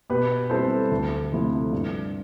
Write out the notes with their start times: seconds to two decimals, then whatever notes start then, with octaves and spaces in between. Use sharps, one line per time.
0.10 B2 G4 B4
0.50 G3 C4 E4 A4 C5
0.91 D2
1.32 C3 F3 A3 E4
1.72 G2